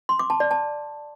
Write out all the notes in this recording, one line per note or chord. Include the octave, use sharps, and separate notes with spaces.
C6
D6
A5
D5
A5